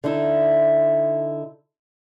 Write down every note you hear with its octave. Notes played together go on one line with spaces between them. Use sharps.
D3 D#4 E4